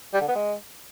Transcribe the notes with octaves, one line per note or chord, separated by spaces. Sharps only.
G3
D3
B3
G#3